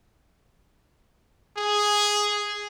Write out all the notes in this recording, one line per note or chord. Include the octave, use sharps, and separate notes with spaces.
G#4